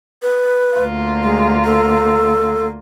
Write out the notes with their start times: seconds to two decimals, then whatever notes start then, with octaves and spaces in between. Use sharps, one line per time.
0.22 B4
0.76 D2 A#3 F4
1.23 G#3
1.64 A4